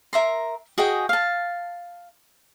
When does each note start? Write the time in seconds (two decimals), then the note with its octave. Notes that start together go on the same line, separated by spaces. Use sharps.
0.13 A#4 E5 A#5 C6
0.78 F#4 G#4 D#5 G5
1.09 F5 A5